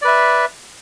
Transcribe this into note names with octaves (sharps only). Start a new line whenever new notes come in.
B4 D5 E5